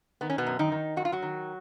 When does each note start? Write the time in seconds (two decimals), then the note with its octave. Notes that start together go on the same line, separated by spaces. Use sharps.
0.21 D#3 B3
0.30 C#4
0.38 B2 B3
0.47 F#2
0.59 D#3 D#4
0.72 D#3
0.97 F#2 F#4
1.05 F4
1.12 F#3 F#4
1.22 D#3